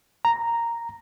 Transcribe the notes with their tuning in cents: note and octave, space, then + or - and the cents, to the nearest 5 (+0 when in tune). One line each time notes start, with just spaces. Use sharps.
A#5 -5